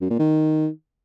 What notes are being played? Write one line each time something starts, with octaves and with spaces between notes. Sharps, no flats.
F#2
A#2
D#3